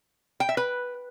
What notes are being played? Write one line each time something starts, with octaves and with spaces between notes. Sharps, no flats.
G5
E5
B4